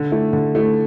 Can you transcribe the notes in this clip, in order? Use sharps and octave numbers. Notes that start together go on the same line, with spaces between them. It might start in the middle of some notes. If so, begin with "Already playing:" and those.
Already playing: D3
A3 E4
D3
A3 E4